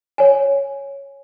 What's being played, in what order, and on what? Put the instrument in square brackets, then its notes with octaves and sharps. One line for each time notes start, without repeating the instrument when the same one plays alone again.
[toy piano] C#5 G#5